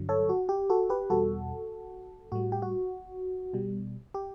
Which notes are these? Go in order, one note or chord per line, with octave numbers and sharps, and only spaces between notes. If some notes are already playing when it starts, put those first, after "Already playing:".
Already playing: G2 D3 F#3
A4 C#5
F#4
G4
F#4 A4
G4 B4
E2 B2 G3 F#4 A4
A2 G3 F#4
G4
F#4
B2 G3
G4